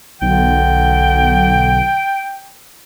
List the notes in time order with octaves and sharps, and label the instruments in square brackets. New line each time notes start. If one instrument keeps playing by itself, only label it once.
[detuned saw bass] B1 [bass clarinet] D3 [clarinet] G5